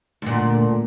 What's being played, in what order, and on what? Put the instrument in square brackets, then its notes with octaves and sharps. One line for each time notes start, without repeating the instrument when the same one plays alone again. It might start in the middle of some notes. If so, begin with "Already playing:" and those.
[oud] D2 A#2